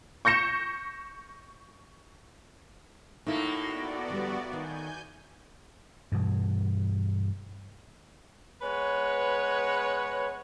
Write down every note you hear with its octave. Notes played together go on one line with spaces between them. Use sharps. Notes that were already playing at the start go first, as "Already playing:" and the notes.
C#6 G6 A#6 C#7 E7
A2 A3 A#3 D#4 E4 F#4
B3 F#4 D5
F2 D3 G3
D#3 F5 G#5 G6
G2 B2 E3
G#3 B3 B4 C#5